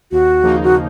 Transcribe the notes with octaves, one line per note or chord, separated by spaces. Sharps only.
D#2 F#4
C#3 F3 A#3 D#4
F#4